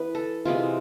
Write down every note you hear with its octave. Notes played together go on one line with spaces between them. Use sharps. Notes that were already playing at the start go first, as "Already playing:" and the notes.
Already playing: E3 B3 B4
A4
C3 E3 G#3 B3 F4